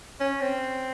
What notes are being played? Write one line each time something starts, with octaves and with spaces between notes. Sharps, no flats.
C#4
C4